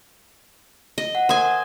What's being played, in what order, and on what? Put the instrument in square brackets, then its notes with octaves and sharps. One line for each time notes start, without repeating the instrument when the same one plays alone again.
[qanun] D#5
[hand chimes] F#5
[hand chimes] A#4 D#6 [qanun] C5 G#5